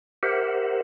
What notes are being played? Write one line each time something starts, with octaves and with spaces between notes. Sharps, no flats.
G4 A#4 C5 E5 F#5